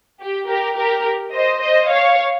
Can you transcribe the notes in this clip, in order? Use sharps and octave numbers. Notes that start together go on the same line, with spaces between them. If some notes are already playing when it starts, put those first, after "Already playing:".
G4
G4 A#4
G4 A#4
C5 D#5
C5 D#5
C#5 F5